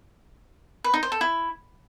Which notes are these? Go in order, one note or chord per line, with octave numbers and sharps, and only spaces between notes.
B4
D#4
C5
A4
E4